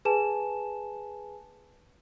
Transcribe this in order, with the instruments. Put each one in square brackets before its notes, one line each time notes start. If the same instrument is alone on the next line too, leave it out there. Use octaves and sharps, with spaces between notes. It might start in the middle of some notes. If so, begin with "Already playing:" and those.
[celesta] G#4 B4 G#5 A5 E7